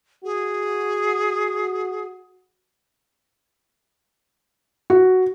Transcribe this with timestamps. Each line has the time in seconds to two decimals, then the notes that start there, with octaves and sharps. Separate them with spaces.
0.24 F#4 G#4
4.90 F#4